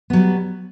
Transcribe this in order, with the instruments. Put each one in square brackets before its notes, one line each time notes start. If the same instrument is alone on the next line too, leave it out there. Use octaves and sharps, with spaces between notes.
[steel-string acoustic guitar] B3
F#3
G3